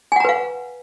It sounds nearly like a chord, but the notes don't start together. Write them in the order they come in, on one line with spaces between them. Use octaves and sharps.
G#5 F#5 A#5 B4 F5